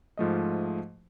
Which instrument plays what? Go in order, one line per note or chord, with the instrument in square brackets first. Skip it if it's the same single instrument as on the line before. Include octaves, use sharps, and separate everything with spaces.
[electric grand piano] G#2 F3 A3 D#5